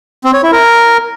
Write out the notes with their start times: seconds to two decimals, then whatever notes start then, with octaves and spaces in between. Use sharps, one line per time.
0.24 C4
0.33 C#5
0.43 E4
0.52 A#4